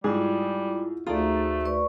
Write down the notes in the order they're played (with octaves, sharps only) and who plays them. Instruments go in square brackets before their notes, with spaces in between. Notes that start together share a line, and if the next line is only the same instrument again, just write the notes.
[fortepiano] G#2 G#4 [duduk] G3 [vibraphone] E4 F4
[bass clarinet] D2 [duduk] A3 [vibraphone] D#4 G#4 A#5 [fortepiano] F4 A4 D5
[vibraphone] B4 D5 C#6